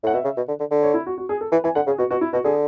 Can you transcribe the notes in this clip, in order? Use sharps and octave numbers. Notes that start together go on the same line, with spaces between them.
A2 F#5
B2 E5
C#3
B2
D3
D3
D3
C#5
E4
F#4
F#4
G#4
A4
E3 B4
E3 G#5
D3 F#5
C#3 G#4
B2 F#4
B2 F#4
E4
B2 F#4
D3 G#4